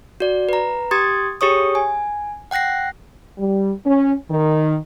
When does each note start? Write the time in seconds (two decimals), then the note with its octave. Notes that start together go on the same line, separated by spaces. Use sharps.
0.20 F#4 D5
0.49 B4 A#5
0.91 G4 C6 D#6 G#6 A6
1.41 G4 G#4 C#5 C#6 D#6
1.75 G#5
2.51 F#5 G5 F#6 A#6 C7
3.38 G3
3.85 C#4
4.30 D#3